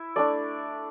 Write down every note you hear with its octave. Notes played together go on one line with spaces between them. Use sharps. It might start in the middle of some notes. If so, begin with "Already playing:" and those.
Already playing: E4 E5
A3 D4 D5